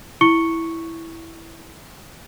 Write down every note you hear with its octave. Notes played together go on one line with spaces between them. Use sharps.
E4 C#6 C#7 G7